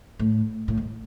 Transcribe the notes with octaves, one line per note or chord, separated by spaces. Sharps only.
A2
A2
G#2